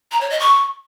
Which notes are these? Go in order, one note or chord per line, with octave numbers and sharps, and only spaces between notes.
A#5
C#5
D#5
C#6